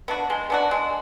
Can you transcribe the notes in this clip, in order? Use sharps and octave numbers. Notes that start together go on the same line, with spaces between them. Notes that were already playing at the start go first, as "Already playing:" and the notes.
B3 D4 F#4
G#3
B3 D4 F#4
G#3